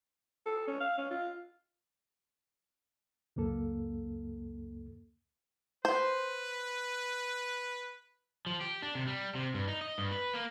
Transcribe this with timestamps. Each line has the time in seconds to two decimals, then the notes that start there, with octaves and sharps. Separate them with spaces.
0.46 A4
0.67 C#4
0.81 F5
0.98 C#4
1.10 F4
3.36 C#2 F#2 A#3 A4
5.85 B4 C5
8.46 F3
8.61 G4
8.82 D4
8.95 C3
9.07 G3
9.35 C3
9.54 G2
9.68 D#4
9.81 D#5
9.98 G2
10.12 B4
10.34 A#3